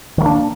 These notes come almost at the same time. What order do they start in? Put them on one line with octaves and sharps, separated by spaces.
D#3 F#3 A#3 D4